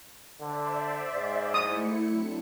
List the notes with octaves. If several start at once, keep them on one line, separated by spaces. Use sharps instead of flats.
D3 C5 D5 E5
G#2
A3 E4 D#6 C#7
F#3 C4 D4